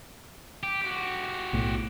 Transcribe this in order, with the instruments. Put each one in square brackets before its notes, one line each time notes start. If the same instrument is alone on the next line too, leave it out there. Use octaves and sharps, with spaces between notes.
[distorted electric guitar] G4
F#4 G4
[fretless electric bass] B1 A2